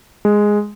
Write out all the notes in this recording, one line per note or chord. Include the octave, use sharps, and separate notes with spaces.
G#3